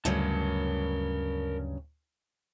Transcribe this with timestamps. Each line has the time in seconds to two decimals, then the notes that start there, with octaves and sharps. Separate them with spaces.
0.05 D2 G2 C#3 F#3 A#4 A5